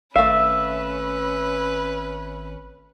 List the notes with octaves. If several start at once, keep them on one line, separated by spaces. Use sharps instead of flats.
G#1 A3 C#4 B4 E5 F5